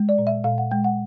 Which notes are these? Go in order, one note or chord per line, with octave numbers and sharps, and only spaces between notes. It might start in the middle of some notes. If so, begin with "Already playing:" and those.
Already playing: G#3
D5
A#2
E5
A#2 F5
F#5
G#3 G5
F#5